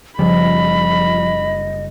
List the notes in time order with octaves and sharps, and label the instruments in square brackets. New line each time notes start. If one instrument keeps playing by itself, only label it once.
[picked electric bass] F#1 C#3 G3 [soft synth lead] F3 [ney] D#5 [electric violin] B5